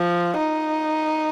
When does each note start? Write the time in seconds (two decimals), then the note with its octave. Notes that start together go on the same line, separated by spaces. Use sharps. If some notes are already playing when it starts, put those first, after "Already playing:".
Already playing: F3
0.38 D#4